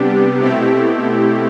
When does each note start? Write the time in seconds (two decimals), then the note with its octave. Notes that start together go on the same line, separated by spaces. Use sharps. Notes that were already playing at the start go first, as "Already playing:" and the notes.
Already playing: C3 G3 B3 D4 G4
0.40 B2 A3 C4 E4 G4